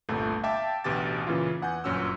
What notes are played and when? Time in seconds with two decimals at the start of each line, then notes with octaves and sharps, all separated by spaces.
0.09 G1 C2 A#2 A3
0.44 E5 F5 G5 A5 D6 A6
0.84 A1 D2 B2 G4 D6 A6
1.27 A#2 C#3 E3 C#4 F4
1.62 E2 F#5 G#5 G6
1.84 G1 F#2 A#2 C#4 F#4 E6